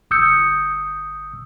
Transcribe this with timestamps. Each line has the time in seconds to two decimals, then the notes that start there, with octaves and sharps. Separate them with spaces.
0.11 G1 D#6 E6 G6 C#7